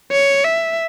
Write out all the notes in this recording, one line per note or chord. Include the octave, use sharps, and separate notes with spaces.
C#5
E5